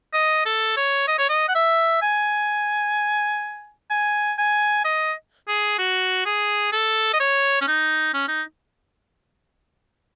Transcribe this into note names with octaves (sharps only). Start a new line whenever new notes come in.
D#5
A4
C#5
D#5
C#5
D#5
F#5
E5
G#5
G#5
G#5
D#5
G#4
F#4
G#4
A4
D#5
C#5
C#4
D#4
C#4
D#4